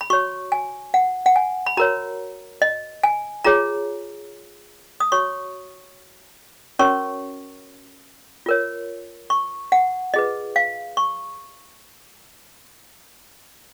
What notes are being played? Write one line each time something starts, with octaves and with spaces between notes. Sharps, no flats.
B5
F#4 C#5 C#6
G#5
F#5
F#5
G#5
B5
F#4 A#4 C#5 A#5
D#5
G#5
F4 G#4 C#5 A#5
D#6
F#4 C#5 C#6
C#4 F#4 A#4 C#5 C#6
F4 A#4 C#5
C#6
F#5
F4 G#4 B4 D#5
F5
C#6